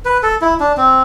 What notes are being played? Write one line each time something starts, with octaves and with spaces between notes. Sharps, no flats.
B4
A4
E4
D4
C4